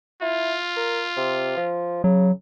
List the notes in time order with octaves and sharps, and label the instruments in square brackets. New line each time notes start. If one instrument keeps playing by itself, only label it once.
[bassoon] E4 [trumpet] F4
[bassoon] A#4
C3
F3
[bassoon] C#3 [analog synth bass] F#3